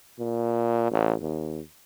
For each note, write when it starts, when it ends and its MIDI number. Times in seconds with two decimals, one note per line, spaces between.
0.19 0.90 46
0.91 1.14 33
1.22 1.60 39